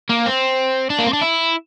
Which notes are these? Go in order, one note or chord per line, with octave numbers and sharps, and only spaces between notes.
A#3
C4
D4
A#3
C4
D4
E4